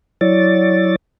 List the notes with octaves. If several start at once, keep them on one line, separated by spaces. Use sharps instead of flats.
F#3 E4 C#5 D5 A6